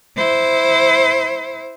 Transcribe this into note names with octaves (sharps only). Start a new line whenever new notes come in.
E4 C5